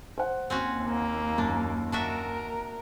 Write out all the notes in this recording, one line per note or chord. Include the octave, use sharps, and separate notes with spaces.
C5 F#5
D#2 C4 C#4 F#4
A#3
F#2 D4
D4 F#4 A#4 E5